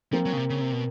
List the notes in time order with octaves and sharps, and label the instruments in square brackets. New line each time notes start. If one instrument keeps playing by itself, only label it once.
[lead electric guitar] F3 [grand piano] A#3 C4
[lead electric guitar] F#3
C#3
C3
C#3
C3
B2